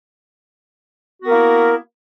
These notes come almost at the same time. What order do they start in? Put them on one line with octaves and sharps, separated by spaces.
F#4 B3 A#4 A#3 E4